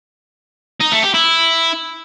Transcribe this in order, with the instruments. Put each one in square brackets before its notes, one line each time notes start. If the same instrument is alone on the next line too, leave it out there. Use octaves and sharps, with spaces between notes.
[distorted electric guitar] D#4
A3
G4
E4